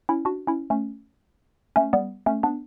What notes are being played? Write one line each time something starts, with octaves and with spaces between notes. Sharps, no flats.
C#4 E4
D4 F#4
C#4 E4
A3 C#4
A3 C#4
G3 B3
A3 C#4
B3 D4